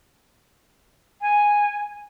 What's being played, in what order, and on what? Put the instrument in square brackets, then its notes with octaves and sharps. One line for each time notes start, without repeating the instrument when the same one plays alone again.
[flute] G#5